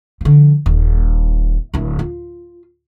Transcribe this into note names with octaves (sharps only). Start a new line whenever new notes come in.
D3 F3
D#1
D1 E4
F4